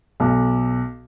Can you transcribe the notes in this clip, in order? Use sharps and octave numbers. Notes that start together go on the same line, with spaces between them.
B1